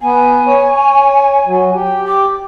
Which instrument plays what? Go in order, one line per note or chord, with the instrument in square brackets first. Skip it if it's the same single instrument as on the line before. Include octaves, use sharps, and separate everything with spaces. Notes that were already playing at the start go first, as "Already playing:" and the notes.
[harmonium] B3 [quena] G#5
[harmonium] C#5
F#3
G4
[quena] D6